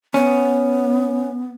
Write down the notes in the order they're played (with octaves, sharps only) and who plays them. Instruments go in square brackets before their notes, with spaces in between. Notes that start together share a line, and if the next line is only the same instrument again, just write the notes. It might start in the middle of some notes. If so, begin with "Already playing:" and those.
[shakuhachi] B3 [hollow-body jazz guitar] C#4